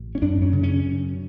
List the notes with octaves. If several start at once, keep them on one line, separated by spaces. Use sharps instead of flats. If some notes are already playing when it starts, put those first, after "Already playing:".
Already playing: A1
C#4
F#2 D4
C#4
C#3
C#4
F#2